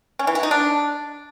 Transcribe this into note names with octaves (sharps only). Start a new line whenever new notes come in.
C#4
E3
F#4
D#4
D4